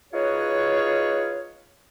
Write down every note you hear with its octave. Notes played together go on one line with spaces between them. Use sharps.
D#4 F4 F#4 G#4 B4 C#5